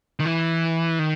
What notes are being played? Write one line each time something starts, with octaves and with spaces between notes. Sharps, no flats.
D#3
E3
D#3